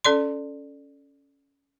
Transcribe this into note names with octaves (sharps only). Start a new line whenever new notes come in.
C#4 A4 D5 C6